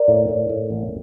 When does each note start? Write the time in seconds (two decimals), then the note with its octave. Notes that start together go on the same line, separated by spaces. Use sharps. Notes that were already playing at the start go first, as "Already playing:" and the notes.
Already playing: A#4 D5
0.08 A2
0.29 A2
0.49 A2
0.70 A1